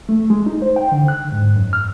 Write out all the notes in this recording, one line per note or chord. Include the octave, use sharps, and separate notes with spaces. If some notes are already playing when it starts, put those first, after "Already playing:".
A3
G#3
D#4
C5
G5
D3
F#6
G#2
F#2
F6